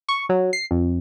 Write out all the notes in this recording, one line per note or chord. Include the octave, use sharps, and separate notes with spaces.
C#6
F#3
C7
F2